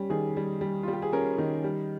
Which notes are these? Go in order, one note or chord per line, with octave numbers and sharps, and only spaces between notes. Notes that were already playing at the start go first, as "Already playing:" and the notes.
Already playing: G3 C#4 G4
D#3 G#4
G3
G3
G3 F4
G4
G#4
C#4 A#4
D#3
G3